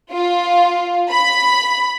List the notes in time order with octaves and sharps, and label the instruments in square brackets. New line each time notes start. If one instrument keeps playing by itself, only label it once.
[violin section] F4
B5